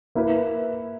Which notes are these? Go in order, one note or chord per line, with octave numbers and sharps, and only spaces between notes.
A#3 E4 B4